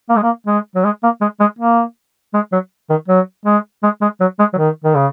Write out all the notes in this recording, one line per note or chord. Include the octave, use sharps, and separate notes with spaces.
A#3
G#3
A#3
G#3
F#3
G#3
A#3
G#3
G#3
A#3
G#3
F#3
D#3
F#3
G#3
G#3
G#3
F#3
G#3
F#3
D#3
D#3
C#3